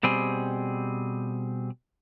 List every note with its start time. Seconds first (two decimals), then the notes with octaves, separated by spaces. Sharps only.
0.03 B2 G3 C4 G#4